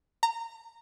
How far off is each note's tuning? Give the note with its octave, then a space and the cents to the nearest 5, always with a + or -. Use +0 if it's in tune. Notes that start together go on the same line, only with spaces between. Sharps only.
A#5 -20